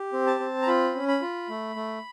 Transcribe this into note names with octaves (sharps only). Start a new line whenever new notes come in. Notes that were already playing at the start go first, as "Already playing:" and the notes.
Already playing: G4
C4
A5
C4
A#5
F4 B5
C#4
B5
F4
A3
A3